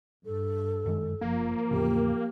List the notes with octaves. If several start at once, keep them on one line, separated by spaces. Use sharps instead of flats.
G2 A4
F#2 D#3 G#3
F#1 F3 A#3
E2 A2 C#3 G4